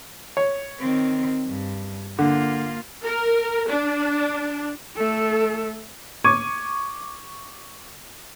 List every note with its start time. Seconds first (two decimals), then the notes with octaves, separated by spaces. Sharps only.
0.37 C#5
0.79 D#3 C4
1.45 G2
2.19 D3 A#3 F4
3.04 A#4
3.68 D4
4.96 A3 A4
6.24 C#6 D6 G#6 D#7